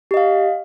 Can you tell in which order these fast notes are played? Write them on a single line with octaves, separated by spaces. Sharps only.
G4 D#5 F5